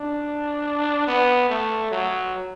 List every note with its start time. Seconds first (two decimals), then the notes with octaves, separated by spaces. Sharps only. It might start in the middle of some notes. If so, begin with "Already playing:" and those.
Already playing: D4
1.08 B3
1.49 A3
1.91 F#3